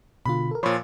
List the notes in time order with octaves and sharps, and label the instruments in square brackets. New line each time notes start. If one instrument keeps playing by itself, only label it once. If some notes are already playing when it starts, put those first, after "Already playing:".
[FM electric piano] B2 D3 F4 [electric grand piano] B5
[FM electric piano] A4 A#4
[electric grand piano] A#2 F3 [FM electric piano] C#5 B5 C6